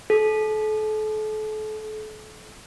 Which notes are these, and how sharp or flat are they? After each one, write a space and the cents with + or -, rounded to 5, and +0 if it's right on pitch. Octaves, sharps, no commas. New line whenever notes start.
A4 -35